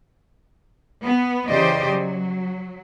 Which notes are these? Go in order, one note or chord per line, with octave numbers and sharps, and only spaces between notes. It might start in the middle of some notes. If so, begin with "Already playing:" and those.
B3
C#3 E3 G4 C5 D5 D#5
F#3